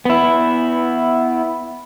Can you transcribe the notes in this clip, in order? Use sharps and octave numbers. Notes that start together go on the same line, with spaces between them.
B3 E4